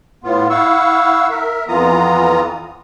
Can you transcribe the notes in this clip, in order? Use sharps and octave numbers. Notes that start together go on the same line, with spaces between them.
A2 B3 F4
E4 F5 F#5 C#6 E6
A#4 E5
F2 E3 B3 F4 A#5 D#6